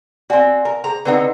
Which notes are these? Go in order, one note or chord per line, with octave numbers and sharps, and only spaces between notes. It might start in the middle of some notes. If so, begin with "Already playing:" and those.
C4 F#4 D5 F#5 G#5
A#4
G#4 C5 A#5
D3 C4 D#4 B4 D#5 F#5